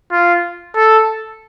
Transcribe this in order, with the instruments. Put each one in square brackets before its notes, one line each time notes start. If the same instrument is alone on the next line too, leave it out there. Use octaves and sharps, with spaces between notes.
[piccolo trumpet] F4
A4